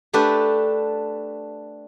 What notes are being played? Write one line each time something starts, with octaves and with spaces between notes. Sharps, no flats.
A3 D4 G4 B4